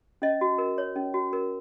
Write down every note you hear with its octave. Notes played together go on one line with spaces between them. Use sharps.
C#4 D#5
F#4
A#4
C#5
C#4
F#4
A#4